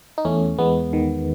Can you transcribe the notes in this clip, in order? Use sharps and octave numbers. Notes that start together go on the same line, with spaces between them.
D#4
E2 A3 C#4
E2 G#3 B3
D#3